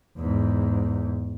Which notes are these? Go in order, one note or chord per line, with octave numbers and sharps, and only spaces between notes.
E2 G#2